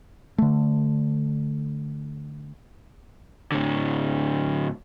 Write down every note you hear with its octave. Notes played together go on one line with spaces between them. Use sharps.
D3 A3
A2 D3